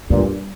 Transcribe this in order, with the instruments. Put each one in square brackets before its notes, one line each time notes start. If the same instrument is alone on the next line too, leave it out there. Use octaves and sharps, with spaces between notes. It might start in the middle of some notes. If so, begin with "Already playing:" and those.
[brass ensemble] G2 A#2 [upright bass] G3